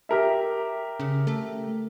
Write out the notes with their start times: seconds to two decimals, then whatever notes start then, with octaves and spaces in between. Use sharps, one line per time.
0.09 G4 A#4 E5
1.00 C#3
1.27 A3